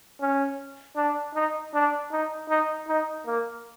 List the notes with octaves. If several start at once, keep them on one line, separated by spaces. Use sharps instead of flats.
C#4
D4
D#4
D4
D#4
D#4
D#4
A#3